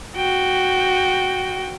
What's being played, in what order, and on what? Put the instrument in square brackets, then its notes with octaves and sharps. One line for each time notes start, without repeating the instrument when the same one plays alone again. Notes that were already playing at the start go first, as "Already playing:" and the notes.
[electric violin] F#4 G5